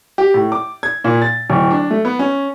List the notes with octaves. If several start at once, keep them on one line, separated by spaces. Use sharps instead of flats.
G4
A2
D6
G#6
A#2
A6
D1
D4
A3
B3
C#4